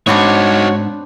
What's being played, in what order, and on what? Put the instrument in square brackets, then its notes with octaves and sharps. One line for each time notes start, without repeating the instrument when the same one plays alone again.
[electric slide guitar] G#2 [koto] B3 C4 D4 [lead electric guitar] D#4 F#4 [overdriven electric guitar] C#5